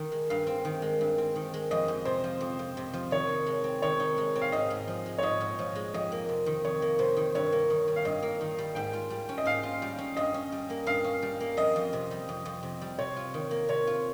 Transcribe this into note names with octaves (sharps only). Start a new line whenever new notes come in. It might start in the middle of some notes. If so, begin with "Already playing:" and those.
Already playing: D#3 D#4
G#3
G2 F5
C4
D#3
G#3
G2
C4
D#3
G#3
F2 D#5
F2
C3 C5
F3
F2
F2
C3
F3
D#3 C#5
D#4
G#3
C4
D#3 C#5
D#4
G#3
C4
F5
G#2 D#5
G#2
F3
G#3
C#5
G#2 D#5
G#2
F3
G#3
F2 D#5
A#3
C3
D#3
F2 C#5
A#3
C3 C5
D#3
G2 C#5
A#3
D#3
G3
F5
G2 D#5
A#3
D#3
G3
G#2 G5
F4
G3
C#4
D#5
G#2 F5
F4
G3
C#4
G2 D#5
C#4
G3
A#3
G2 F5
C#4
G3
A#3
F2 D#5
F2
C3
G3
F2
F2
C3
G3
C3 C#5
F4
D#3
A#3
C3 C#5
F4